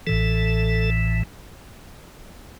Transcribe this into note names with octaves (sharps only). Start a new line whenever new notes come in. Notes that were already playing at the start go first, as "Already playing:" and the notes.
A1 A2 E3 A4